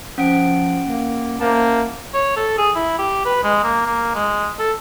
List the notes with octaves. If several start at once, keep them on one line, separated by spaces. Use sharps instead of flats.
F3 C#4 F#5 D7
A#3
A#3 E4 C5 A5
C#5
A4
G#4
E4
G4
B4
G#3
A#3
A#3
G#3
A4